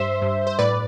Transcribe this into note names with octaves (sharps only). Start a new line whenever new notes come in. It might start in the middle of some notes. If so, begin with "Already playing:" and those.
Already playing: G2 C5 E5
G2
C5
A2 B4 D5